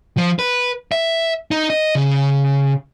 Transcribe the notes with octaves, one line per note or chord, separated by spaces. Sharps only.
F3
B4
E5
D#4
D#5
C#3